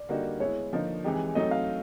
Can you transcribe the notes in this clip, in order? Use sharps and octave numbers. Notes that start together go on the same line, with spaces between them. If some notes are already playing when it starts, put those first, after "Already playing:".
Already playing: D5
D3 G3 A#3 D#4 F#4
G#3 B3 E4 C#5
D3 F3 A#3 D#4
E3 G#3 C4 D#4 G4
F#3 A3 C4 D#4 D#5
F5